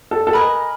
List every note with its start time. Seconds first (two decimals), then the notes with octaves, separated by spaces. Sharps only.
0.11 A4
0.27 A4
0.33 A#4 B4 D#5 G#5